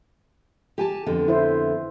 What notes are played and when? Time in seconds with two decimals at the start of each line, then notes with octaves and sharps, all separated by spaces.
0.78 G4 G#5 A5
1.06 F2 D3 B3
1.28 E4 C5